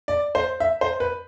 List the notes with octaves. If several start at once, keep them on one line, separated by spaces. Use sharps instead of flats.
D5
C5
E5
C5
B4